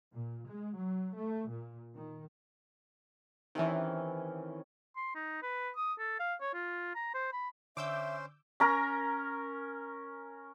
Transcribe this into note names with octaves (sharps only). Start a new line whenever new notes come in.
A#2
G#3
F#3
A3
A#2
D#3
C3 D#3 E3 C#4
C6
D#4
B4
D#6
A4
F5
C#5
F4
A#5
C5
B5
D3 C#4 C5 E5 D6 E6 G6
C#4 A#4 A#5